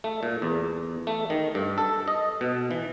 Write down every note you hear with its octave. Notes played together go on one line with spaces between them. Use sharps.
A3
A#2
E2
A3
D#3
G2
A4
D#5
B2
E3